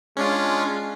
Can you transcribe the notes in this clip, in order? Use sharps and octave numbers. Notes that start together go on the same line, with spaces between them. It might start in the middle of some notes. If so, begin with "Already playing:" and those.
G#3 C#4 D4 F4